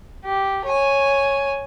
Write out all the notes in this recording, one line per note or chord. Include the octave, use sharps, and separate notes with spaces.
G4
C#5 G#5